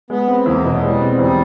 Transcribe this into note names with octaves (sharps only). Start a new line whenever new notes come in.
G#3 B3
C4
E2 A#3
B2
F#3
G3 G#3
C4
E2 G3